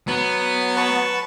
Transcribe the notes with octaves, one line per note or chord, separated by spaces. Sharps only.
F#3 B3
B4 A5 C#6